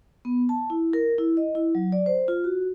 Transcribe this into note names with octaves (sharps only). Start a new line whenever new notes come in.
B3
A5
E4
A#4
E4
D#5
E4
F#3
D5
C5
F4
F#4